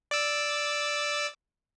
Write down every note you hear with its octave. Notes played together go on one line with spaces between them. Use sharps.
D5 D6 E6